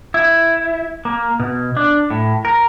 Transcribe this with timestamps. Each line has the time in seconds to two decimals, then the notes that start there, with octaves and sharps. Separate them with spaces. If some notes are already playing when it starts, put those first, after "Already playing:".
0.14 E4
1.05 A#3
1.40 B2
1.77 D4
2.10 A2
2.45 A#4